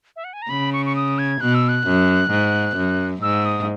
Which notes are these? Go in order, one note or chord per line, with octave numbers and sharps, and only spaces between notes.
E5
F#5
G#5
A#5
C#3 B5
C#6
C#6
D#6
G#6
B2 F#6
E6
F#6
F#2
G#2
F#2
G#2 E6
D#6